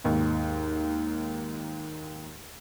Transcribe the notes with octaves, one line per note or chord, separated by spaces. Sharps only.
D#2 G#2